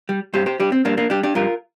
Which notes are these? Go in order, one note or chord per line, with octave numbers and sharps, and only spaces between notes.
G3
G2 G4 C5
G4 C5
G3 D4 G4
C4
G2 A#3 D4
A#3 D4
G3 D4 G4
D4 G4
G2 F4 A#4